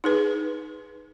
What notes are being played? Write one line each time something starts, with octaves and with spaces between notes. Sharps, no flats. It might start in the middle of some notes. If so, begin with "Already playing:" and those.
D#4 G#4 B4